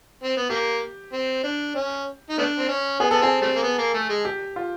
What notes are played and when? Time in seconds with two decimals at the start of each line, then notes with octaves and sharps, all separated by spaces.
0.24 C4
0.37 B3
0.50 A#3 G4
1.13 C4
1.43 D4
1.75 C#4
2.29 D#4
2.38 A3 B3 D4
2.59 C4
2.69 C#4
3.00 B3 G#4
3.11 B3 A4
3.22 C4 G#4
3.42 G3 A3 C4
3.56 A#3
3.63 B3
3.78 A#3
3.94 A3
4.09 G#3
4.25 G4
4.56 F4